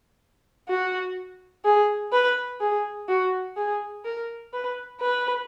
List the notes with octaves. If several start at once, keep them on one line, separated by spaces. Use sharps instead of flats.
F#4
G#4
B4
G#4
F#4
G#4
A#4
B4
B4